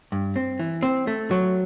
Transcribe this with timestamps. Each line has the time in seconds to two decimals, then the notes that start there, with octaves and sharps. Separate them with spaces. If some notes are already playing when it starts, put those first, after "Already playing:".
0.12 G2
0.36 C4
0.59 E3
0.83 C4
1.07 A3
1.31 F#3